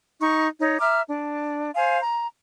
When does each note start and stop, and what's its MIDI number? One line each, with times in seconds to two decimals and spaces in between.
0.20 0.46 63
0.20 0.46 85
0.59 0.78 63
0.59 0.78 73
0.80 1.01 76
0.80 1.01 82
0.80 1.01 86
0.80 1.01 89
1.08 1.70 62
1.75 2.00 72
1.75 2.00 77
1.75 2.00 80
2.01 2.27 82